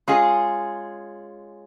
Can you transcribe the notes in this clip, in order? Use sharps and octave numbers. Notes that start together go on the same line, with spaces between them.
G#3 C#4 F4 G#4